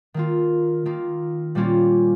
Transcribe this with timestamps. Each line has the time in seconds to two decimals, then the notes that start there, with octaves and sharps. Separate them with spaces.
0.14 D#3 A#3 F4
0.86 D#3 A#3 F4
1.55 A#2 G3 A#3 C#4 F4